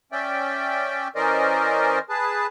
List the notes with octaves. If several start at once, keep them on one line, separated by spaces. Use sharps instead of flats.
C#4 D5 E5 G5
E3 C#4 A#4 C5 D5 D#5
G#4 B4 A5